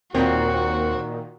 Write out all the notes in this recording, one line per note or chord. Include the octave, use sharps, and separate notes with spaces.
D#2 A#2 D#3 C4 F#4 C#5 G5